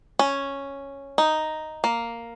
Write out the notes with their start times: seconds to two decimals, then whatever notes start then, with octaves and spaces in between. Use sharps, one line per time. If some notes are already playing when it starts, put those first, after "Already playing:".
0.19 C#4
1.18 D#4
1.84 A#3